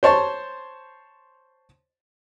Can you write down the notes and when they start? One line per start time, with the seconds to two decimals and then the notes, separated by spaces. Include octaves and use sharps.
0.03 C5 C#5 A5 C6